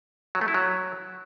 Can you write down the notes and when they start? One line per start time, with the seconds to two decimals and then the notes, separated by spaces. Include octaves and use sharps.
0.35 F#3
0.41 A3
0.48 E4
0.54 F#3